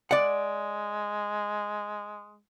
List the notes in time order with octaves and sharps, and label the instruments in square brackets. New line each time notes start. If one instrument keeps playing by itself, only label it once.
[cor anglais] G#3 [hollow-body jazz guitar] D5 F#5